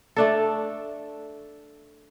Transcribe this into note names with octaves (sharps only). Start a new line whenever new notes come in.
A3 D4 A4